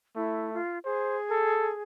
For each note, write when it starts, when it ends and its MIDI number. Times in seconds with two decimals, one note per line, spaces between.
0.16 0.61 57
0.16 0.52 64
0.53 0.79 65
0.85 1.83 68
0.85 1.18 72
1.30 1.73 69